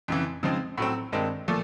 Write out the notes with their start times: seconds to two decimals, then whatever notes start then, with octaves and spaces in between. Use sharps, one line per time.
0.08 F2 C#3 E3
0.43 C#3 F3 G#3 C4 D#4
0.78 A2 F#3 A3 C4
1.12 G2 D#3 G#3 C4
1.48 A#2 F3 A3